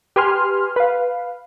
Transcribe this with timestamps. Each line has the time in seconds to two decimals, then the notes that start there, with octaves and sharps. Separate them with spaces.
0.16 G4 B4 G#5 C6 F6
0.76 B4 F5